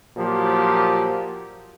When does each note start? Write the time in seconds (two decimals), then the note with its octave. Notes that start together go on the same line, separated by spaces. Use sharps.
0.16 A#2 F3 F#3 G4